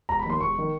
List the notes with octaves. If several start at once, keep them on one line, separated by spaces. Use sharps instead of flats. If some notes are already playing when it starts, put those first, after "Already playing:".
E1 A#5
B5
D#2 D#3 C6
E1 C#6
D#3